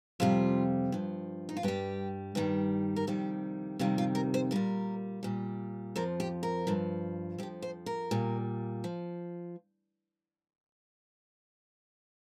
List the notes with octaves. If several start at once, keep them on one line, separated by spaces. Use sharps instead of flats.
F2 C3 G3 F4
G2 F3
D#4
F4
G2 G3 G4
G2 D#3 G3
A#4
F2 C3 D#3 G3 G4
F2 C3 D#3 G3 F4
F4
A#4
C5
A#2 G3 A#4
A#2 G3
F2 F3 A#4
G4
A#4
G2 F3
F2 F3 G4
C5
A#4
A#2 G3
F3